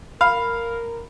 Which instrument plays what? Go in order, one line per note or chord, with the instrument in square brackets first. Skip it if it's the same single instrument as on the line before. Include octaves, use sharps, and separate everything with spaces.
[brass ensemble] A#4 [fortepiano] F5 [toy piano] B5